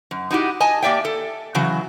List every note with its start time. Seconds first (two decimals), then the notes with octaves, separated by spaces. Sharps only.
0.11 F#2
0.31 D#4 E4 F#4 G4
0.60 D#5 G#5 A5
0.83 A#3 G4 D5 E5 G5
1.05 A4
1.55 C#3 E3 F#3